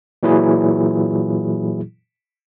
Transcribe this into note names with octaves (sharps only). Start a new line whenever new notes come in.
A#2 E3 F#3 E4 G#4